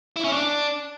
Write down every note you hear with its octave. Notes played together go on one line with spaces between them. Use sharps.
E4
C#4
D4